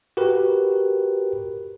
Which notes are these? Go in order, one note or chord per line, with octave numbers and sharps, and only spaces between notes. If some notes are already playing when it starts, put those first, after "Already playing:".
F#4 G4 A#4 B4